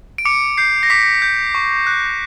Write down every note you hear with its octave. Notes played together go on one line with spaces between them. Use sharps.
D7
D6 C#7
G6 C7
A#6
D6 B6
G6
C#6
F#6